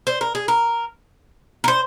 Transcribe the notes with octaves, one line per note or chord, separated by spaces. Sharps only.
C5
A#4
G#4
A#4
A#4
C5